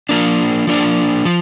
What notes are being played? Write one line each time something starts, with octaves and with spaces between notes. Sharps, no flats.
F3 A#3 D4
F3 A#3 D4
F3